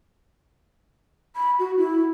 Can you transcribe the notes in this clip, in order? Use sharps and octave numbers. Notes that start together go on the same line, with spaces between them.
B5
F#4
E4